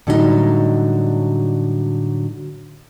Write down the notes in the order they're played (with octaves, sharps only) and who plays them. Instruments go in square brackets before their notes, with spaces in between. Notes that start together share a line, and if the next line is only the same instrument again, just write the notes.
[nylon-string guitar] A2 D3 F#3 G3 C#4 D#4